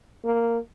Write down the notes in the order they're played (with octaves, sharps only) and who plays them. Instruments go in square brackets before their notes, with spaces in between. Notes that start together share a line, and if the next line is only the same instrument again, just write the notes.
[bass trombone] A#3